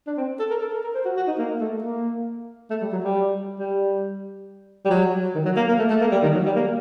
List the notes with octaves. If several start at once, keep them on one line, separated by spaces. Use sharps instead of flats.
D4
C4
A4
A#4
A4
A#4
A#4
C5
F#4
F#4
D#4
A#3
A3
A#3
A3
G3
F#3
G3
G3
G3
F#3
D#3
F#3
A#3
A#3
A3
A3
A#3
G3
D#3
F#3
G3
A#3